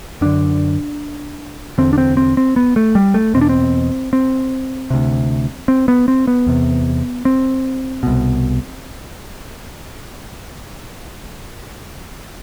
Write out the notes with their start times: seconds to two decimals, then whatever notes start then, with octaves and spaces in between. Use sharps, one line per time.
0.21 F#2 D3 D4
1.78 E2 D3 C4
1.93 D4
1.98 C4
2.17 C4
2.37 C4
2.56 B3
2.76 A3
2.95 G3
3.14 A3
3.34 E2 B2 C4
3.41 D4
3.49 C4
4.13 C4
4.90 D2 C3
5.68 C4
5.88 B3
6.08 C4
6.27 B3
6.47 E2 C3
7.25 C4
8.03 C2 B2